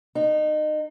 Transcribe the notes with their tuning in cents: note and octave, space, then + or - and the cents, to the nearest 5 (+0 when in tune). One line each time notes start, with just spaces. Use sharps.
D#4 -25